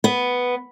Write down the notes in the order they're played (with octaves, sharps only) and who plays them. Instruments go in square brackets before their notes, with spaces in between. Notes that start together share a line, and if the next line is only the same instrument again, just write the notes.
[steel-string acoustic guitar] B3